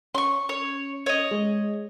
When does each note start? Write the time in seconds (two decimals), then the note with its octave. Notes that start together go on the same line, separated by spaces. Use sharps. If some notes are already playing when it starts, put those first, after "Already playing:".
0.15 C#4 C6 C#6
0.49 C#5
1.06 C#5 D#5
1.31 G#3